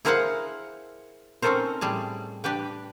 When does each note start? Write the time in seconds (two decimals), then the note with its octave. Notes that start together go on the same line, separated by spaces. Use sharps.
0.05 E4 G#4 A#4 C5 F5 F#5
1.42 C4 C#4 D#4 A4 A#4 C5
1.81 A2 G3 G#4 A5
2.44 D4 G4 B4 G5